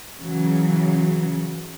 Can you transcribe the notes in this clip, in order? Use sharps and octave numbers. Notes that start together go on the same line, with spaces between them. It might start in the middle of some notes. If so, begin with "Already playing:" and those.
C#3 E3 F#3